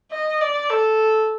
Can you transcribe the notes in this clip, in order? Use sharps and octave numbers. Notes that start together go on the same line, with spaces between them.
D#5
D5
A4